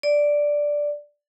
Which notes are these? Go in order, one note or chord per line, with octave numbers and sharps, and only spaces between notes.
D5